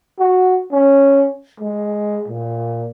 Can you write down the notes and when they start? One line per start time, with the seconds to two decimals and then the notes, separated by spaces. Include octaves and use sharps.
0.20 F#4
0.72 C#4
1.60 G#3
2.28 A#2